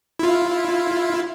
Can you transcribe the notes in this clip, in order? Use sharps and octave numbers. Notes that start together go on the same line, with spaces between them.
E4 F4